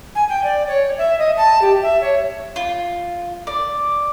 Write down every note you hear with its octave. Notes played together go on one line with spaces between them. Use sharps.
G#5
G5
D5
C#5
E5
D#5
A5
G4
E5
C#5
F4
D5